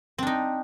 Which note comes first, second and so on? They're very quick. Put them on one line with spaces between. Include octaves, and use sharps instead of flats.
C4 D4 D#4